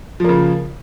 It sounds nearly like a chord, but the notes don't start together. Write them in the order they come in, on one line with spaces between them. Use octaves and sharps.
F3 A#3 C#3